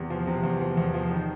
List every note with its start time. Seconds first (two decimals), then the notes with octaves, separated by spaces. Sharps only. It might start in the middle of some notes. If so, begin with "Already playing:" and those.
Already playing: E2 C3
0.10 F3
0.27 C3
0.43 E2
0.61 F3
0.77 E2
0.94 F3
1.11 D#3